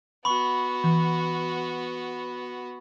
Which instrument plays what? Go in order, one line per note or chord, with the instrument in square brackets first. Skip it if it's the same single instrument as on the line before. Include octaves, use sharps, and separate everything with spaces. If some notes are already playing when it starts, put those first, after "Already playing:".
[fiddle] B3 F#4 [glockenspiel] B5 C#6
[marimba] E3